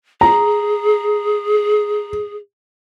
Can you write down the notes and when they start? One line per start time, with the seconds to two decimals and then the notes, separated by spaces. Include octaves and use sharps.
0.21 G#4 A#5